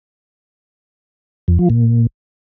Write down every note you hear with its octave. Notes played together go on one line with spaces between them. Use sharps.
F2
F3
A#2